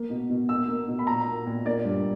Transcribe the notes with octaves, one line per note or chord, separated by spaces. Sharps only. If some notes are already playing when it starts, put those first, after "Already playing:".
Already playing: A#3
B2
B2
B2 E6
A#3
B2
B5
A#2 A#5
A#3
A#2
A#3 D5
G2